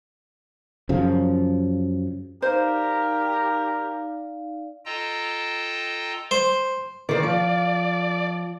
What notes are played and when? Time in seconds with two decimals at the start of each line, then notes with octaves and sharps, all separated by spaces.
0.89 F#2 C#3 F3
2.42 D#4 G4 A#4 C5 D5 F5
4.85 F4 A4 D#5 G5 A5 A#5
6.31 C5
7.09 D#3 C5 D5
7.23 F3